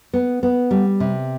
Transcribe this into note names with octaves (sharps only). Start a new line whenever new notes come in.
B3
B3
G3
C3